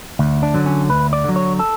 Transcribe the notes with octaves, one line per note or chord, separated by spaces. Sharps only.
D2
D4
D3 F#3
C#4
D2 B4
D5
D3 F#3
C#5
A4